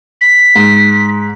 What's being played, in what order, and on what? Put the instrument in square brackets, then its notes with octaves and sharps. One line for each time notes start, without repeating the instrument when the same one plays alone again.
[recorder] B6
[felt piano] G#2